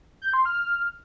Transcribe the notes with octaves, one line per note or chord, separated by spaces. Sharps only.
G6
C6
F6